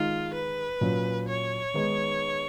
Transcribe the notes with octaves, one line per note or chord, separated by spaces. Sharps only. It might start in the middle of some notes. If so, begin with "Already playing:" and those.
Already playing: D#3 G#3 D#4 F4
B4
A#2 F#3 C#4
C#5
D#3 G#3 B3 D#4